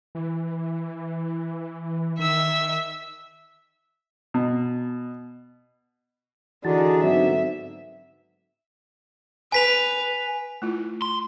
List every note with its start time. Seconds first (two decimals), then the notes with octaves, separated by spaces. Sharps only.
0.15 E3
2.19 D#3 E5 E6
4.34 B2
6.65 D3 E3 D4 D#4 F#4 G#4 A5
7.03 G#2 D3 F#3 B3 C4 F#4 E5
9.52 B4 G#5 B6 F7
10.62 A3 E4 F4
11.02 C6